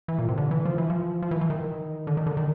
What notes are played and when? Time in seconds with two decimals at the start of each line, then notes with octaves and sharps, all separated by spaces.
0.08 E3
0.19 A#2
0.28 C3
0.38 D3
0.51 E3
0.65 F3
0.78 E3
0.90 F3
1.22 F3
1.31 E3
1.41 E3
1.50 D#3
2.07 D3
2.17 D#3
2.27 D3
2.37 D#3